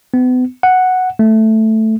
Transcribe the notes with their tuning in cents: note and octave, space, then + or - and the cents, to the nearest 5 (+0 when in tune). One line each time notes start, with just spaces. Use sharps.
B3 +35
F#5 +0
A3 +0